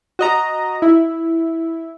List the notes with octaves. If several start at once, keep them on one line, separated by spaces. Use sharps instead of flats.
F#4 D#5 A#5
E4